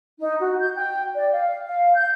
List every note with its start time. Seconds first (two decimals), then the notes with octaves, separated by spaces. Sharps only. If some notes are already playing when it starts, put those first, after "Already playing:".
0.20 D#4
0.41 F#4
0.59 G6
0.75 G5
1.15 D5
1.33 F5
1.66 F5
1.95 G6